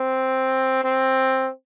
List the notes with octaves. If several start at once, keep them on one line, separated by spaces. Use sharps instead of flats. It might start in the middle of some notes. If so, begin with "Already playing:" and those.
Already playing: C4
C4